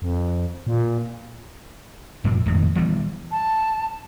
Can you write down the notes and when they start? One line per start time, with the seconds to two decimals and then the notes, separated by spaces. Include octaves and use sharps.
0.02 F2
0.67 A#2
2.24 F1 F#2 A#2 A#3
2.46 E1 F2 A2 D#3
2.75 D#1 E3 G3 B3
3.31 A5